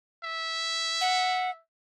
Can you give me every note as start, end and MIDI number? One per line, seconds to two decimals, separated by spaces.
0.24 1.60 76
1.01 1.50 78